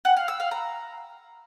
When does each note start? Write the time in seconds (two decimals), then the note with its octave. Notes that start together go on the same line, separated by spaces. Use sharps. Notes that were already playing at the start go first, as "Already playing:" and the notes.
0.05 F#5
0.17 F5
0.28 E6
0.40 F5
0.51 A#5